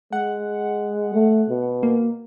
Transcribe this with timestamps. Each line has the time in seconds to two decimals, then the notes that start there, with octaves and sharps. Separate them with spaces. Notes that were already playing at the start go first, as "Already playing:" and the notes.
0.13 G#3 F#5
1.15 A3
1.50 B2
1.83 A#3